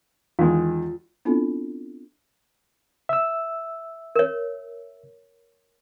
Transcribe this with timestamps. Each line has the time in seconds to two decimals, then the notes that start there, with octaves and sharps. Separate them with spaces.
0.39 E2 D#3 G#3 F4
1.25 B3 C4 D4 E4 F4 A4
3.09 E5 E6
4.16 A#4 C#5